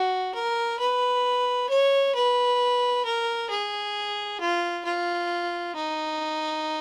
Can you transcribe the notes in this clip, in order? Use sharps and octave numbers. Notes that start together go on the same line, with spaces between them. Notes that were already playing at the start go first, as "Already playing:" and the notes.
Already playing: F#4
A#4
B4
C#5
B4
A#4
G#4
F4
F4
D#4